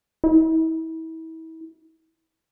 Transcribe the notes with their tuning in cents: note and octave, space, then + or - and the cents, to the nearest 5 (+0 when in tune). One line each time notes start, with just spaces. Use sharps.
E4 -35